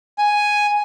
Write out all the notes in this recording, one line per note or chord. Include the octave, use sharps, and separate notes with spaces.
G#5